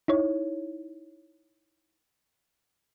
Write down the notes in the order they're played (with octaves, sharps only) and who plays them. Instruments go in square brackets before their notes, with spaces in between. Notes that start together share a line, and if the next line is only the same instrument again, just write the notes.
[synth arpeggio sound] D#4 E4 C#5